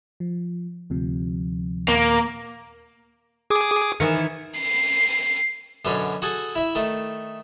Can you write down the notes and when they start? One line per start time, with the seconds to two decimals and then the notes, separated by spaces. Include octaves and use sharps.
0.20 F3
0.90 D2 C3 F3
1.88 D#2 A#2 A#3 A#4
3.50 G#4 D6 D#6
4.00 D#3 E3 C#7
4.60 C7
5.85 F#2 B2 D3 C#4
6.22 F#4 G#4 A4
6.55 E4 E5
6.75 D#3 A3